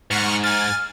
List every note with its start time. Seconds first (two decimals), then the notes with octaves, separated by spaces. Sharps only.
0.11 G#2 F#5 C#6 F6
0.43 G#5 F6 A6